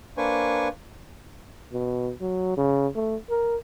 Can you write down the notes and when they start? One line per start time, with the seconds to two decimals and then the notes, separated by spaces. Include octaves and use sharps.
0.17 A#3 D4 B4 C5 G#5 C#6
1.73 B2
2.21 F#3
2.57 C#3
2.95 A3
3.30 A#4